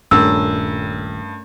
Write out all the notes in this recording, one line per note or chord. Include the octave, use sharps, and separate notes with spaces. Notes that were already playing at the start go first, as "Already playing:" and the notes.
D#1 G2 A3 C#4 A#4 E6